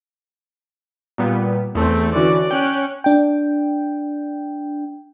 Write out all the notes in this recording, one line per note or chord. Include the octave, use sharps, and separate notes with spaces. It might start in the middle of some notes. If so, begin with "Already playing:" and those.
A#2 G3 B3
E2 A3 C4
D3 E3 C#4 F#4 D5
C#4 G5 F#6
D4 G5